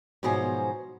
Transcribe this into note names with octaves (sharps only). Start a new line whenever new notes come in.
G#2 B2 F3 F#3 C5 G#5